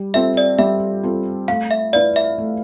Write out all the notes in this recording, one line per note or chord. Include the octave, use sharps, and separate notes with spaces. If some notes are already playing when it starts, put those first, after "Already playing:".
Already playing: G3
C4 F4 A4 E5
D5
G3 E5
C4 F4 A4
A3 F5
E5
E4 B4 D5 F5
E5
A3